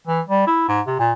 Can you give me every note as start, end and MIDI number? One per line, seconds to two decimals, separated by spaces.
0.07 0.21 52
0.28 0.47 55
0.47 0.64 64
0.68 0.81 44
0.87 0.96 48
0.99 1.13 46